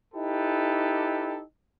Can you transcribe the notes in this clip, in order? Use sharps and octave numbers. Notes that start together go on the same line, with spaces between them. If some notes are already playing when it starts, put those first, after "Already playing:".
D#4 E4 G4 A4 B4